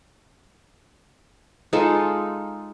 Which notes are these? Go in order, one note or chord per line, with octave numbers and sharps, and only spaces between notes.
G#3 D#4 F4 A4